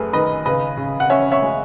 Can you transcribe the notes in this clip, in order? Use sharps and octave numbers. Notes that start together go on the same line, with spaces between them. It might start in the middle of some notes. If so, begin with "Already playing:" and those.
Already playing: F#2 A3 G#4 B4
D#3 B4 D#5
C#3 B4 D#5
C#3
F#5
C#4 C#5 E5
C#5 E5
G#3